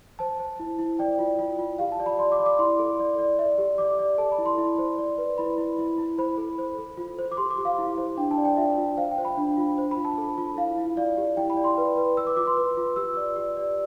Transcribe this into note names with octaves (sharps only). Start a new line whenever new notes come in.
C5 A5
C5
E4
E4
D5 G5
F4
F4
F4
G4 F5
A5
D5
B5
D5 C6
D6
D5
D6
E4 C6
A4
D5
D5
D5 E5
G4
D5 D6
D5
A4 A5
B5
E4
C6
E4
C5
D5
B4
E4 B5
E4
E4
E4
C5 B5
A4
C5
A4
F4
C5
D6
G4 C6
D6
G4
F5
E4
C5
D4 G5
A5
D5
G5
F4 E5
F4
C5 F5
G5
C5
B5
D4
F4
C5
B5
F4
A5
A4
F4
E4 F5
E4
D5 F5
G4
E4 G5
B5
D5
C6
B4
B4
B4 E6
D6
F4 D6
C6
B4
F4
G4 E6
D5
G4
D5